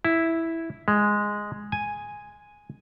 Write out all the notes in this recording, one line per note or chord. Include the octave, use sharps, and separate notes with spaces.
E4
G#3
G#5